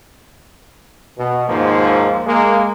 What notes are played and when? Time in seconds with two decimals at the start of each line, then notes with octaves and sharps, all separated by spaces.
1.18 B2
1.49 D#2 G#2 F3 A#3
2.27 G#3 A#3